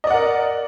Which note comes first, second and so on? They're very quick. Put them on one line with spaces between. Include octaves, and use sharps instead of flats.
D#5 D5 F#5 A#4